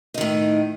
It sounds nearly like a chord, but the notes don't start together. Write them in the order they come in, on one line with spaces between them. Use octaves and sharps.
D#4 D#3 A2